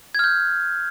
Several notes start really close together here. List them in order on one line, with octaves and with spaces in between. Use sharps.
G#6 F6 G6